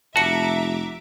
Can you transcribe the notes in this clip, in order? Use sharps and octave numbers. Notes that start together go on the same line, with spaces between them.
F1 F#4 E5 A5 A#5 D6 C#7